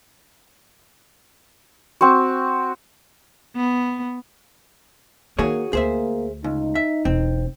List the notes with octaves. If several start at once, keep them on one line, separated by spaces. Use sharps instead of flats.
C4 F#4
B3
D#3 A#3 F#4 G#4 C#5
D2 A#3 G#4 C5 E5
C#2 D#4
E5
E1 C4